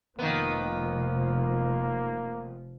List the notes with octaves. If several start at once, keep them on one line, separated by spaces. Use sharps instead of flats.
F1 D#3 F3 A#3 B3